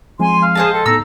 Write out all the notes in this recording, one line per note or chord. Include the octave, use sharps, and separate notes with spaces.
F3 G#3 C4 G#5 C6
F5
G#4 C5 D#5 A5
A4 G5
A2 B3 D#4 A#5 E6